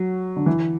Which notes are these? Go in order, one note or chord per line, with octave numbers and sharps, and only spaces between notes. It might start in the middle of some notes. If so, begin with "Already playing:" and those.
Already playing: F#3
D3
E3